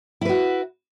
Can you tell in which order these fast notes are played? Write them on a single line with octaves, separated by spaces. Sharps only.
E4 B4 F#4